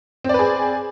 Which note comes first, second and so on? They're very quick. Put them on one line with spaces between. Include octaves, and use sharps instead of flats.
C4 D5 B4 G#4